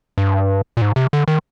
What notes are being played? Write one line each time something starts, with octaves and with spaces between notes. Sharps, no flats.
G2
A#2
G#2
C3
D3
D#3